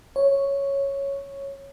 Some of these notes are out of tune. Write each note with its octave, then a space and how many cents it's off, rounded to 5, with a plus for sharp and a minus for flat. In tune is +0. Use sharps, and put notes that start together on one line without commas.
C#5 +0